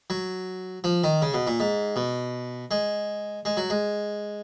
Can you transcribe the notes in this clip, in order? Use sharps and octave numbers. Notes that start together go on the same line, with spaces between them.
F#3
F3
D#3
C#3
B2
A#2
G#2
B2
G#3
G#3
F#3
G#3